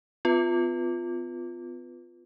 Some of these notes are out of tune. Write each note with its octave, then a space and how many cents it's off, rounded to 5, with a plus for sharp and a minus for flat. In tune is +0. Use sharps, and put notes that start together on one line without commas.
B3 +45 F4 +5 B4 +0